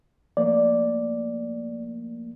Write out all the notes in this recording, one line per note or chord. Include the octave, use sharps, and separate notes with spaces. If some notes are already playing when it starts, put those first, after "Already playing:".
F3 A3 A#3 D5